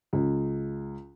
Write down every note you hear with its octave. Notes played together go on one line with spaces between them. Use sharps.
C#2